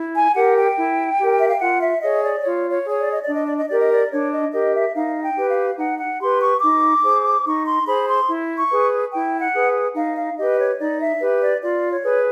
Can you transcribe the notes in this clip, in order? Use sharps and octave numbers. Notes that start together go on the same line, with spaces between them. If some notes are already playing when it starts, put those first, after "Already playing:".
Already playing: E4
G#5
G4 A#4 F#5
G5
E4
G4 A#4
E5
F5
F4 F#5
E5
G#4 C#5 D#5
D5
F4 C#5
C#5
G#4 C#5
D5
D#5
D5
D4
D#5
D5
D#5
G4 A#4 D5
D#5
D5
D4 C#5
D#5
G4 A#4 D#5
E5
D#4 F5
G5
G4 B4
F5
D#4 F#5
F#5
G4 B4 C6
C#6
D#4 D6
G#4 C5
D#4 C#6
C6
G#4 C5 B5
C6
E4
C#6
G#4 B4
E4 G5
F#5
G#4 B4
D#4 F5
F5
G4 B4 D#5
C#5
D#4 D5
E5
G4 B4
D5
F4 D5
C#5
G#4 B4